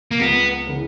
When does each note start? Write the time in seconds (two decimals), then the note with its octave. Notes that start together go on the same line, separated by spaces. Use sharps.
0.11 A#3
0.19 C#2 B3
0.67 C#3 E3 B3